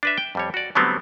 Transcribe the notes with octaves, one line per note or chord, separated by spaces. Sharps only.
D4 B4 E5
G5
F2 G3 C#5
F#4 D5
D3 F#3 G3 A3 B3 C4